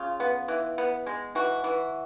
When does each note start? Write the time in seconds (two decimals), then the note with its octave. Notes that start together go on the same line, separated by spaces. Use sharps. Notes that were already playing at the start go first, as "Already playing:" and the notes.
Already playing: C#3 F4
0.20 B3
0.48 E3
0.78 B3
1.06 G#3
1.35 E3 F#4
1.64 E3